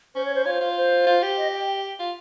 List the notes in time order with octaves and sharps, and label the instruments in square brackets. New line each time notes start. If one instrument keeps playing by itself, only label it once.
[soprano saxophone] C#4 [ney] C5
[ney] C#5
C5
[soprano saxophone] F4 [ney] C#5
[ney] C5
[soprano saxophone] F4
[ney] C5
[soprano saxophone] F4
G4
[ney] D#5
G5
[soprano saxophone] F4